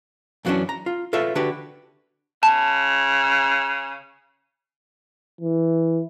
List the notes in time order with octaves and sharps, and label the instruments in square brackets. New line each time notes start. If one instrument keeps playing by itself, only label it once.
[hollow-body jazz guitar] F#2 E3 F#3 G#3 C#4 D4
A#5
F4
F4 A4 B4 C#5 E5
D3 D4 F#4 G4 B4
[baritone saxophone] C#3 [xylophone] A5
[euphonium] E3